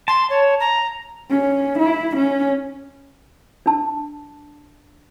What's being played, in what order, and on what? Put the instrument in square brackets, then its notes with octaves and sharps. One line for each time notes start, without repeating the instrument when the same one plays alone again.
[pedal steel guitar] A5 [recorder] C6
[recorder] C#5
A#5
[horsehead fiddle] C#4
E4
C#4
[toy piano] D4 A5